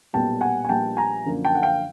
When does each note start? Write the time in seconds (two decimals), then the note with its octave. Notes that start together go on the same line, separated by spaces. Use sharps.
0.13 B1 A#2 G3 B3 G5 A5
0.41 F#5 G#5
0.65 G#5
0.69 A#1 A#2 G3 B3 G5 A5
0.97 G#5 A#5
1.25 F#2 D3 F3 A#3
1.45 G5 A5
1.55 F#5
1.62 F5 G5